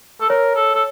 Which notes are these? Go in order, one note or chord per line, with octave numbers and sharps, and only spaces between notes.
A4
A#4 C#5
A4
A4